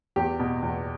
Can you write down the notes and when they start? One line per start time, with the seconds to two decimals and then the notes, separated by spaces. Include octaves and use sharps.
0.16 E2 G4
0.40 B2
0.62 E2